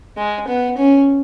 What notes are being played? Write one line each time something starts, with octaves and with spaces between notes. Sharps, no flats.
G#3
B3
C#4